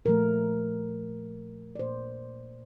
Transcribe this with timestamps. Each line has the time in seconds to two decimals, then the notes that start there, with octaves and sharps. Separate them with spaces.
0.05 A#2 F3 A3 A#4
1.75 D5
1.79 A#2 F3 A#3 C5